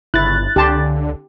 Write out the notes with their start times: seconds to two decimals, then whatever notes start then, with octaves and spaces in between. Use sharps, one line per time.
0.14 G1 C#3 E4 F#6 A6
0.56 C#2 D3 G4 A5 C6